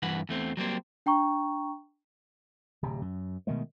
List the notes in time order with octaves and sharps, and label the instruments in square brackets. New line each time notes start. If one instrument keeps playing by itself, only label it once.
[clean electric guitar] G2 E3 B4 F#5
E2 A3 C4
F#3 G3 A#3 C4
[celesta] D4 G5 A#5 C#6
[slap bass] D1 C3
F#2
B2 D#3 G#3 A3